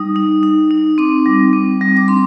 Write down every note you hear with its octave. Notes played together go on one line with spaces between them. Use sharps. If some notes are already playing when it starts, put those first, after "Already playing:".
Already playing: G3 D#4 D#6
D#4
D#4
D#4
C4 D6
G3
C4
G3
D6
D4 C6